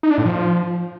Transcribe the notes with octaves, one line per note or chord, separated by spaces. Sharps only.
D#4
D4
A2
F3